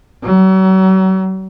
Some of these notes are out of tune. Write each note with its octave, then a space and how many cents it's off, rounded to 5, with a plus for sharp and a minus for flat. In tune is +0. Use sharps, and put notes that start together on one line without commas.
F#3 +40